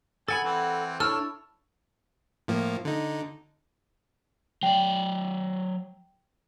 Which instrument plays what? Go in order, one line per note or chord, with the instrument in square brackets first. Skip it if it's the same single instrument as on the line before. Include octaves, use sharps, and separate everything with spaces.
[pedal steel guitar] A4 F#5 B5 [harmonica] G#5 [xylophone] A6
[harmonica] E3 C4
[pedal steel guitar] D4 E4 A4 [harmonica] C#5 [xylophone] E6 F6
[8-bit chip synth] A2 F3 A#3
D3 D#4
[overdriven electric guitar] F#3 D5 [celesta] G5